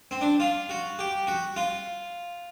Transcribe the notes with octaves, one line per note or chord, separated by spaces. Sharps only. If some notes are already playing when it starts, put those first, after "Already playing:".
C4
D4
F4
F#4
G4
F#4
F4